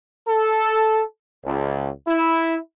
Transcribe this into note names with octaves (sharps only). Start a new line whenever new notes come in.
A4
C#2
E4